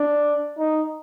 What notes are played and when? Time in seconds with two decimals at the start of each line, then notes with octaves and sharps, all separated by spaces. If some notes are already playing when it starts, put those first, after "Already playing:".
Already playing: D4
0.58 D#4